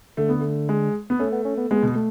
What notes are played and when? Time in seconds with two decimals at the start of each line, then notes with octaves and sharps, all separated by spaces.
0.17 D3 A3
0.29 B3
0.40 A3
0.69 G#3
1.10 B3
1.19 A3 C#4
1.32 B3
1.45 C#4
1.57 B3
1.71 G#3 B3
1.83 B2
1.95 A3